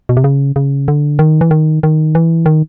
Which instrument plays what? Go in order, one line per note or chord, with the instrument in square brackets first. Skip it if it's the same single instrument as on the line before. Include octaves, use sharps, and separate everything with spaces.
[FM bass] B2
C3
C#3
C#3
D3
D#3
E3
D#3
D#3
E3
D#3